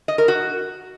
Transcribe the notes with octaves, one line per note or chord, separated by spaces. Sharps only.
D#5
A#4
F#4